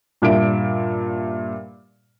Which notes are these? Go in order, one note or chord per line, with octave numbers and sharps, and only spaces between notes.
G2 A#2 E5 D7